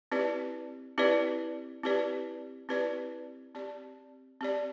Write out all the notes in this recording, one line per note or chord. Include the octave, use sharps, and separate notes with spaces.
C4 E4 G4 B4 D5
C4 E4 G4 B4 D5
C4 E4 G4 B4 D5
C4 E4 G4 B4 D5
C4 G4 D5
C4 G4 D5